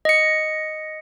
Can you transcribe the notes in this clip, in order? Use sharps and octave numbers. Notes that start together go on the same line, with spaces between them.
D#5 C#7